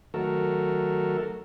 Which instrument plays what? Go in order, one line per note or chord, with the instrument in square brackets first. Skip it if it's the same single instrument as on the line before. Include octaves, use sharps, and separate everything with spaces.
[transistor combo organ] D#3 F#3 A3 F#4 A4 A#4